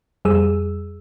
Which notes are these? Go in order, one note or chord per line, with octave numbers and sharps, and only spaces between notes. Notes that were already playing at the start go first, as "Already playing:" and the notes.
F2 G3 G#4 E6